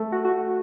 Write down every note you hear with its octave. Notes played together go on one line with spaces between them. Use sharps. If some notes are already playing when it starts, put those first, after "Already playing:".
Already playing: A3
F#4
F#4